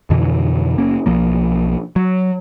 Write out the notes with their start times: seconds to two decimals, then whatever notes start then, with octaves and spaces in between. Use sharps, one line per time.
0.10 F2 B2 D3 E3
0.78 F#1 A#3 C#4
1.06 B1 F3 A#3
1.96 F#3